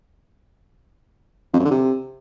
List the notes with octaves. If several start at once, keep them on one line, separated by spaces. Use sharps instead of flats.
F2
F#2
D3
C3